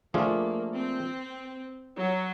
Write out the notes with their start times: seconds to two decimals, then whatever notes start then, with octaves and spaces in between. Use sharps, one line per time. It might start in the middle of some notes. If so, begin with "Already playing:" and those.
0.14 F3 A3 A#3 D4 F4 G#4
0.75 C4
1.98 F#3